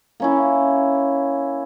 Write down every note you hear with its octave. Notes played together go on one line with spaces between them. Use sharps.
A#3 C#4 E4